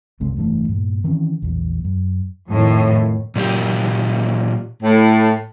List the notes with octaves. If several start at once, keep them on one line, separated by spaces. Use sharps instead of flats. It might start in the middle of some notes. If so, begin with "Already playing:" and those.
F#1 C2 G#3 C4
F1 G2 E3 A3
G2 A#2
D#3 E3 C4 C#4
A#1 E2
F#2
F2 A2 D#3
A#2 F#3 A#3 G4
A2